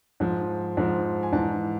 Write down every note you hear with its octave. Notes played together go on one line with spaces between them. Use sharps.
G#2 F3
G#2 F3
G#5
G#2 E3 A5